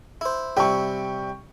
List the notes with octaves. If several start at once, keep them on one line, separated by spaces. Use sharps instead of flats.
E4 C5
C3 G3 E4 G5 C#6